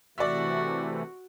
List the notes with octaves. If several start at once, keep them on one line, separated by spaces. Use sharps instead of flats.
C3 E3 A3 F#4 D5 E5